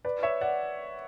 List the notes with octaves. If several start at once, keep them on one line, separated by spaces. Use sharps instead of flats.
B4 D5
C#5 E5
D5 F#5